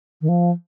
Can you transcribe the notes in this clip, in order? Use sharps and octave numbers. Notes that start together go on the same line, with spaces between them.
D#3
F3